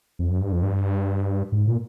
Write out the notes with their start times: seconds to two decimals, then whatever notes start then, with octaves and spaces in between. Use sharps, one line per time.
0.19 F2
0.31 F#2
0.41 G2
0.52 F2
0.63 G2
1.52 G#2
1.67 A#2